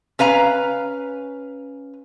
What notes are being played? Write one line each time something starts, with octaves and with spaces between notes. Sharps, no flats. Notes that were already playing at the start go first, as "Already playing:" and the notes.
C#4 B4 F5 A#5